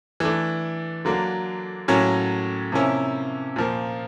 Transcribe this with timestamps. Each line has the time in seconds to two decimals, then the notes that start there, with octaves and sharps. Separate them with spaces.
0.20 E3 A3 D4
1.05 D3 F#3 A#3 D4
1.88 A2 F#3 A#3 C#4
2.72 C3 F3 A#3 C#4 E4
3.56 A#2 F3 A#3